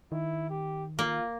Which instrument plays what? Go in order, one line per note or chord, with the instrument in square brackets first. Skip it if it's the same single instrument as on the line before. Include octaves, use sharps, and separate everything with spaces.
[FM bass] D#3 [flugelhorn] E4
[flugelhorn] G4
[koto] A#3 [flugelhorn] F4